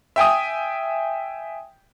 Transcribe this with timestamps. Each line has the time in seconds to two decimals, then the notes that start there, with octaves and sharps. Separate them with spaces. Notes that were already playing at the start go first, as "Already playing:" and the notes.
0.16 E5 G5 G#5 D#6